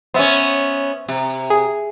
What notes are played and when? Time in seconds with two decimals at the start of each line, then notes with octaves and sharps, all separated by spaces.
0.14 B3 C#4 C5 E5
1.09 C3
1.50 G#4